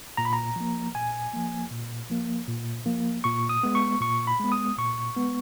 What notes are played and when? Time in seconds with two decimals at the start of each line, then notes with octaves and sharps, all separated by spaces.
0.17 A#2 A#5
0.25 B5
0.33 A#5
0.56 F3 A#3
0.95 A#2 G#5
1.33 F3 A#3
1.71 A#2
2.10 F3 A#3
2.48 A#2
2.86 F3 A#3
3.24 A#2 C#6
3.49 D#6
3.63 G#3 B3
3.75 C#6
4.01 A#2 C#6
4.27 B5
4.40 G#3 B3
4.52 D#6
4.78 A#2 C#6
5.16 G#3 B3